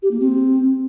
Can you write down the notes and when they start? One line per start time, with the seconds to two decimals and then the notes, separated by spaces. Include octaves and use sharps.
0.02 G4
0.11 A#3
0.20 C4